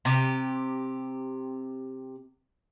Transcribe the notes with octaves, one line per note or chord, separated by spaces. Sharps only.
C3 G4